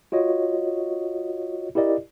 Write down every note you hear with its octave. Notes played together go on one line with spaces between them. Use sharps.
F4 F#4 C#5 D#5
E4 G4 A#4 D5 D#5